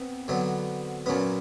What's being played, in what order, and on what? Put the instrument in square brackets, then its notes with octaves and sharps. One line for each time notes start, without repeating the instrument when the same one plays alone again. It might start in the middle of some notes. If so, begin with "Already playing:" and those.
Already playing: [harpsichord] B3 [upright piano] C4
[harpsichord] D3 F#3 B3
[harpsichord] A#2 F#3 B3 [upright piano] C#4